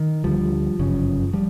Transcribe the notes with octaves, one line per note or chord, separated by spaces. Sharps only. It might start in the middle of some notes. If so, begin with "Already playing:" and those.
Already playing: D#3
D2 D3 F3 G3
G1 F#2 C#3
F3 G3